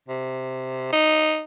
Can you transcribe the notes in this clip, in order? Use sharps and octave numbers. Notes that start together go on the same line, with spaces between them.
C3
D#4